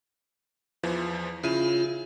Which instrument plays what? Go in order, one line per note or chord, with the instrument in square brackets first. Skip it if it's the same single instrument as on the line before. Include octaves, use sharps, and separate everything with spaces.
[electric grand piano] E2 E3 F3
[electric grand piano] C#3 E4 D#7 [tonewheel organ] F4